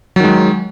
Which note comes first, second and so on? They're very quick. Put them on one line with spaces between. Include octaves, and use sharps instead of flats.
F#3 D#3 G#3